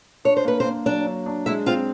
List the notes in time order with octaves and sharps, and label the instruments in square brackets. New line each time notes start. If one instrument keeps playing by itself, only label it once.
[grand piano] D4 [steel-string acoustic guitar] C#5
[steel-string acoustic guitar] C5
[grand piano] A#3 [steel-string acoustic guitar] B4
[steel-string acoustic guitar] C4 C5
[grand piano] A#3
[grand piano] F#3 [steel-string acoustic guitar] D4 D5
[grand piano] F#3
D4
[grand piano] G#3 [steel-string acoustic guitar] E4 E5
[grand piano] C4 [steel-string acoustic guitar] F4 F5